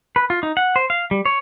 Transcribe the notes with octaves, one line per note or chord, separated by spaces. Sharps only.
B4
F4
D#4
F#5
C5
F5
G3
C#5